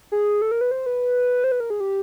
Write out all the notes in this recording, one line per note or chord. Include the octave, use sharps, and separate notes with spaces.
G#4
A4
A#4
B4
C5
B4
C5
B4
A#4
G#4
G4